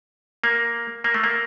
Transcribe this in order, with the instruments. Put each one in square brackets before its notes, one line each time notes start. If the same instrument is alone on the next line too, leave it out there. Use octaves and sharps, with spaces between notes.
[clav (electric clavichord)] A#3
A#3
A3
A#3